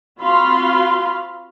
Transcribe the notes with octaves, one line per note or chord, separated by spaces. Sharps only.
C4 F4 F#4 F5 B5 C6